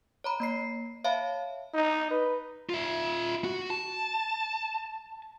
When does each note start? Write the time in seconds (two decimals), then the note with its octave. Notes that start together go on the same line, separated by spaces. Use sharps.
0.24 C#5 A#5 B5
0.40 A#3 B5 C7
1.04 C#5 E5 F5 A5 B5
1.74 D#4
2.11 B4
2.69 F4 E5
3.44 F#4
3.70 A5